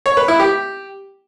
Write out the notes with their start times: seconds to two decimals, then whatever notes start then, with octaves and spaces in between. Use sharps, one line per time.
0.06 C#5
0.17 B4
0.28 E4
0.40 G4